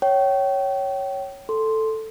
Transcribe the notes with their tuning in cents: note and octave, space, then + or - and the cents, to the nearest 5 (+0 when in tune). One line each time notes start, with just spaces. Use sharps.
C#5 +0 G5 -30
A4 +0 C6 +0